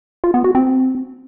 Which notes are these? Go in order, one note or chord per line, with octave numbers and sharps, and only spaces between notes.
F4
B3
F#4
C4